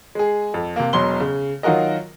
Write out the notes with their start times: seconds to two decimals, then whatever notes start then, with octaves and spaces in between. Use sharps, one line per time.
0.15 G#3 G#4
0.54 F2
0.76 C3 A#3
0.93 E1 B2 F#3 C6 G7
1.20 C#3
1.63 D#3 F#3 F4 F#4 A#4 D#5